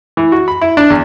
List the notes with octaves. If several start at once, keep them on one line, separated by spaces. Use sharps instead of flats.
E3
F#4
B5
E4
D4
E2